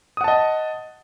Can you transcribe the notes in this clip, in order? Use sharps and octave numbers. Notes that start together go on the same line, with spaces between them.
D#5 F#5 A5 D#6